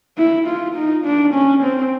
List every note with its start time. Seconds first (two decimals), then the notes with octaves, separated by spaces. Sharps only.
0.17 E4
0.47 F4
0.76 D#4
1.05 D4
1.34 C#4
1.63 C4